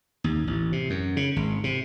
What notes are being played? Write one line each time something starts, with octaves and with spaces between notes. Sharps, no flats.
D#2
A1
C3
F#2
C#3
G#1
C3